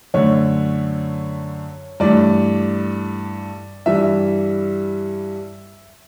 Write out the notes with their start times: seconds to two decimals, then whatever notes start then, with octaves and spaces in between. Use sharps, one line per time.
0.14 F#2 D3 A3 C#5
2.00 G2 E3 A3 D5
3.86 G2 E3 G3 E5